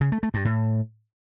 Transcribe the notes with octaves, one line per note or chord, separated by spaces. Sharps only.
C#3
A3
A3
G2
A2